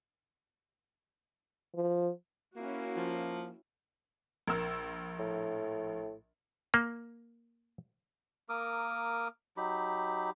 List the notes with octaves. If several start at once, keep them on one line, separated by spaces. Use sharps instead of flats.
F3
A#3 C#4 E4 F#4
F3
A#1 A#4 E6
A2
A#3
A#3 A#4 D6 D#6
F#3 D#4 G4 B5